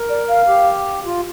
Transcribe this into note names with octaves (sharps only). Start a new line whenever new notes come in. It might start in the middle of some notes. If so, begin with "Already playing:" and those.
Already playing: A#4
D5
F5
G4
F4